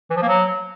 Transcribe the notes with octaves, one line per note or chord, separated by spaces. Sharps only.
E3
F3
A#3
F#3